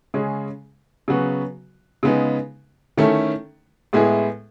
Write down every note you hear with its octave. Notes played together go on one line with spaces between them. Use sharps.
C#3 G#3 C#4 G#4
C#3 F#3 B3 F#4
C#3 G#3 B3 D#4
D#3 A3 C#4 E4 A4
A2 G#3 B3 E4 G#4